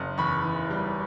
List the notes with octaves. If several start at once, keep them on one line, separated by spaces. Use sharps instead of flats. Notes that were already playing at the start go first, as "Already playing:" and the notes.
Already playing: F#1
E2 B5 C#6
E3
G3